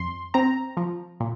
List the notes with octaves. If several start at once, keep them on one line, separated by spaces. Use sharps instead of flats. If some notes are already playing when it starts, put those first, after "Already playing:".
Already playing: F2 C6
C4 A#5
F3
A#2